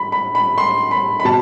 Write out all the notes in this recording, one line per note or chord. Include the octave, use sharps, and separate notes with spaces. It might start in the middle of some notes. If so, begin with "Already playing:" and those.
Already playing: B5
B5
B5
C6
B5
B5
B2 A5